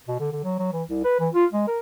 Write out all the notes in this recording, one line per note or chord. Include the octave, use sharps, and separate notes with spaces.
B2
D3
D3
F#3
F#3
E3
C2
B4
E3
F4
G#3
A#4